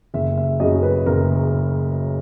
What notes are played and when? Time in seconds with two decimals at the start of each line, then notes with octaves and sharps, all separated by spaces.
0.14 F#1 E5
0.38 E5
0.60 F#2 C#3 D#5
0.83 B4
1.06 F#1 A#4